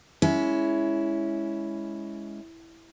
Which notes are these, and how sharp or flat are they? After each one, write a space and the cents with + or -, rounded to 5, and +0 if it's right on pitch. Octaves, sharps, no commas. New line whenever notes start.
G#3 +0 C#4 +15 E4 +0